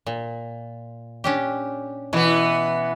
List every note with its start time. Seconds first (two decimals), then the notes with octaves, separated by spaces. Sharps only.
0.06 A#2
1.24 C#4 D4 G4
2.13 B2 E3 B3